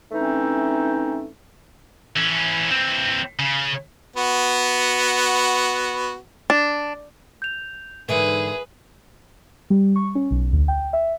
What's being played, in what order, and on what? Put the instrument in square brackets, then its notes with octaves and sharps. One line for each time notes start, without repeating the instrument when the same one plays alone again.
[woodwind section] E3 A3 C4 C#4 D#4
[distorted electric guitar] E3 C#4
E3 C4
C#3
[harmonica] B3 F#4
[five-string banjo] D4
[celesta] G6 F7
[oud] G#2 D3 E3 [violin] G#4 [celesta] A#4 E5 [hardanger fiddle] B4
[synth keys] G3
C#6
C#4
B1
D2
G5
E5